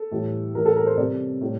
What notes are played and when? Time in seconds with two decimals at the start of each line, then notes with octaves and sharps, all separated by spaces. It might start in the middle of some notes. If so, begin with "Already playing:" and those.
Already playing: A4
0.11 A2 E3 G3
0.54 A2 E3 G3 A#4
0.66 A4
0.77 A#4
0.87 C5
0.97 C3 G3 D5
1.41 A2 G3